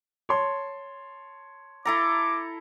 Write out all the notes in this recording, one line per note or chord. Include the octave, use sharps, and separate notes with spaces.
C#5 A5 C6
E4 A4 A#5 D6